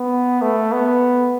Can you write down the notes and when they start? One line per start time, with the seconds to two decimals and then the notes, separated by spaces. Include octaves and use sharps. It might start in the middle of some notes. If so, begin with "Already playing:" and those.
Already playing: B3
0.42 A3
0.72 B3